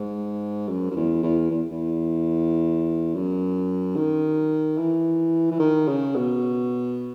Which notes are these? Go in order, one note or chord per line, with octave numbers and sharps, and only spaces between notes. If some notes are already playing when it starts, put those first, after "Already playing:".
Already playing: G#2
F#2
F#2
E2
E2
E2
E2
F#2
D#3
E3
E3
D#3
C#3
B2